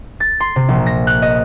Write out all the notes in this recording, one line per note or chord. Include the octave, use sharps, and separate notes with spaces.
A6
C6
C3
A#1
A#6
F#6
D#5